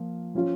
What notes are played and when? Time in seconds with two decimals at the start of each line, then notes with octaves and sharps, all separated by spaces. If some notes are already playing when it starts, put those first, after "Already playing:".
Already playing: F3 A#3 F4
0.35 F3 C#4 F4